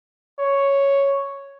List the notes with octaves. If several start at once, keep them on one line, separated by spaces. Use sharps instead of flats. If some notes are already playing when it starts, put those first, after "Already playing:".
C#5